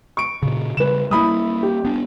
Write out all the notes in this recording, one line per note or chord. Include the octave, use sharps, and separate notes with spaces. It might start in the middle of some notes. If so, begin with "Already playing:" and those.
C#6 D7
A#2 C#3
C#3 G3 B4 E7
G3 A#3 E4 B5 D#6
G4
B3 D4